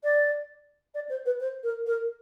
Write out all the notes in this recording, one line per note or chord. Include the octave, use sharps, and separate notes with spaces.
D5
D5
C5
B4
C5
A#4
A#4